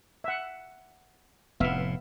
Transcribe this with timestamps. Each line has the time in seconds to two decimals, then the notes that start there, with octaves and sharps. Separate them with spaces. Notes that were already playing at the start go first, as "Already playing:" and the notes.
0.24 E5 F#5
1.60 F1 A2 B3 E5 F5